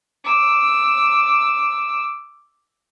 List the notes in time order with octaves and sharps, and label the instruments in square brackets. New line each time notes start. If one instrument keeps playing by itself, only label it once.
[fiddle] D6 E6